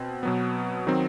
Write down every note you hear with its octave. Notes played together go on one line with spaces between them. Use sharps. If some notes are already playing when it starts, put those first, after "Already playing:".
Already playing: B2 C4
B2 F#3 B3
D#3 F#3 C4